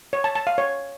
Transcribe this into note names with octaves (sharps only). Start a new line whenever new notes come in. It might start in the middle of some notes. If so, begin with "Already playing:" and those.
C#5
A5
A5
F5
C#5